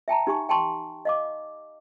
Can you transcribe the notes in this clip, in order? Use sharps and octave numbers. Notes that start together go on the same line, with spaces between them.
E5 G5 A5 A#5
D#4 G4 G#5 C#6
G5 A5 C6 C#6
D#5 F5 D6